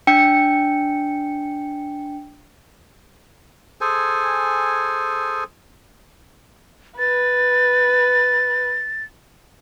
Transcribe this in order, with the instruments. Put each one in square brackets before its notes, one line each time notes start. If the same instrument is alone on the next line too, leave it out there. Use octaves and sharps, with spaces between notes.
[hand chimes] D4 G5 C#7
[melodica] G#4 A4 C5 G#5
[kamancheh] B4 [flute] A6